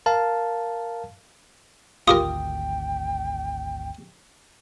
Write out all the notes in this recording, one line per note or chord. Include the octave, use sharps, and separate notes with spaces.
A#4 F5 A5
G#1 D2 F4 G4 A#4 G5 D#6